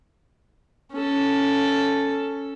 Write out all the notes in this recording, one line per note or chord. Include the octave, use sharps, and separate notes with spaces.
C#4 A4